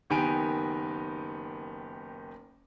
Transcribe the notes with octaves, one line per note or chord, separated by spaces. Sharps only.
F#1 D#3 B3 G4 G#5 D7